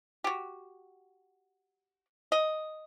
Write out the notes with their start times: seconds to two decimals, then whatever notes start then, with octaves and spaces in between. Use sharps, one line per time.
0.24 F#4 G4
2.32 D#5